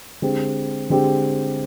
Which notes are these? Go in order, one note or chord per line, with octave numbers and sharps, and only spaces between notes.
D3 G#3 C4 G4
D3 G#3 C4 G4